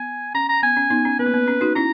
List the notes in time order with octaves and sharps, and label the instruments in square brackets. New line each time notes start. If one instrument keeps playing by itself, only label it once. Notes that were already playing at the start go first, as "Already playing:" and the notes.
Already playing: [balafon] B3 [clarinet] G#5
[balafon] C#4 [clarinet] A#5
[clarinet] A#5
[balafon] B3 [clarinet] G#5
[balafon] C#4
B3 D#4
C#4
[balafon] B3 [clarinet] B4
[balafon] A#3
B3
C#4
D#4 F#4
[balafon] C#4 E4 [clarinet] A#5